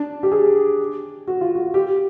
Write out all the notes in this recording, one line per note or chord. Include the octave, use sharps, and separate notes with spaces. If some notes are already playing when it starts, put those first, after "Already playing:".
Already playing: D4
G4
G#4
F#4
F4
F#4
G4